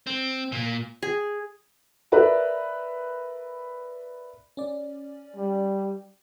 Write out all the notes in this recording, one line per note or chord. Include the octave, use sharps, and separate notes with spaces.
C4
A#2
G#4
A#4 B4 D5 E5 A#5
C#4 D5
G3